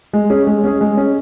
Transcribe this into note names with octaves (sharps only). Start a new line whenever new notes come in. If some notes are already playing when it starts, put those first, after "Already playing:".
G#3
C#4 G#4
G#3
C#4 G#4
G#3
C#4 G#4